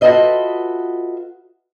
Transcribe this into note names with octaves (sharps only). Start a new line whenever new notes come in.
F4 F#4 A4 B4 D#5 E5